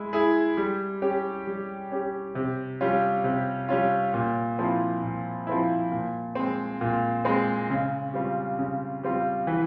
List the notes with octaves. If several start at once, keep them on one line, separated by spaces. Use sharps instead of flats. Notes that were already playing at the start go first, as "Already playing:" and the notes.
Already playing: G#3 E4
E4 G#4
G3
C#4 G4
G3
C#4 G4
C3
G3 C#4 F4
C3
G3 C#4 F4
A#2
F3 C4 E4
A#2
F3 C4 E4
A#2
G#3 C4
A#2
G#3 C4
C#3
G3 C4 F4
C#3
G3 C4 F4
E3